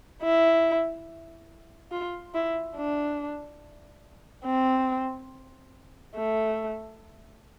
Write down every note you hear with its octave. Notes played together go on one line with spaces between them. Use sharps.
E4
F4
E4
D4
C4
A3